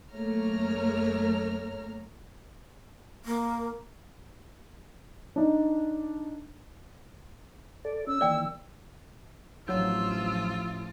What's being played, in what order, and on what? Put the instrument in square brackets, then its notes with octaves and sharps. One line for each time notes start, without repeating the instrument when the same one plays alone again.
[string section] F#2 A3 A#3 C#5 A#5 F6
[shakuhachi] A#3
[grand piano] D4 D#4
[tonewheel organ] A4 D5
[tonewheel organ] C#4 [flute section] E6
[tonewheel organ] D#3 E3 A#3 [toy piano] D5 G5
[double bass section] A1 F3 [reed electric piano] F#3 D4 G6 [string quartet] F4 [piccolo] E6